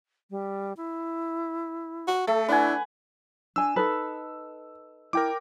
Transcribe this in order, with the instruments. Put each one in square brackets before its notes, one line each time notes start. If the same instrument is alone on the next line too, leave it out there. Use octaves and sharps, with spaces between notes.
[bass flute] G3
E4
[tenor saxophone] F#4
[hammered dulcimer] A3 [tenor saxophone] A4
[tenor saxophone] D4 [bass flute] E4 [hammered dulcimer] B4 F#5 G#5
[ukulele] D4 G#5 [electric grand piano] E6
[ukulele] D#4 A4 B4
[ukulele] E4 [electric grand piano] A#4 G5 D6